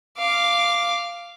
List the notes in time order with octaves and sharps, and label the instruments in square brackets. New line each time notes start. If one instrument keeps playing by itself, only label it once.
[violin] F5 D6